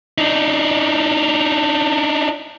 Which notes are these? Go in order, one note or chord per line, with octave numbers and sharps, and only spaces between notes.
D4 D#4